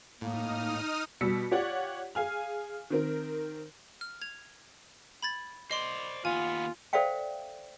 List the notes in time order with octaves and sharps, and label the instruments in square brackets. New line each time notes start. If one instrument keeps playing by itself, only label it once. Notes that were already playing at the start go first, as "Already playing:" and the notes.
[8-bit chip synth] A2 [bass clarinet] A#3 [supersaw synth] D#4 D#6 F6
[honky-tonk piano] B2 G3 E6 B6 C#7
F4 G4 C#5 D5 F#5
G#4 F5 G#5 F6
D#3 C4 A#4
[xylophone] F6
G#6 F7
B5 G#6 A6
[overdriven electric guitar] C5 D5 [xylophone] D#5 C6
[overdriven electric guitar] D#2 B3 [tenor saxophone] F4 [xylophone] G#5
[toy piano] A4 C5 D5 E5 F5 G5